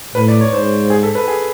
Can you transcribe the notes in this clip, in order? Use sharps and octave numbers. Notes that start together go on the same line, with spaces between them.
A2 B4
D5
C#5
G#2 C5
G#4
A4
B4
G#4